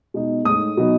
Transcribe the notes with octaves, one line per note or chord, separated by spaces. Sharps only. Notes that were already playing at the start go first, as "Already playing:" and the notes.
B2 G#3 D#4
A2 G#3 D#4 D#6
B2 F#3 B3 D#4